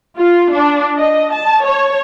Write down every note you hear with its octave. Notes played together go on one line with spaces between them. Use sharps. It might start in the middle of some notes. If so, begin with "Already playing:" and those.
F4
D4
D#5
A5
C#5